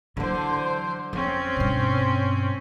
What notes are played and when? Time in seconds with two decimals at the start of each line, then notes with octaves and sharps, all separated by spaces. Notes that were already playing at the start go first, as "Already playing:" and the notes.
0.17 D3 E3 F#3 C5
1.13 F2 C4 C#4
1.56 G2 B2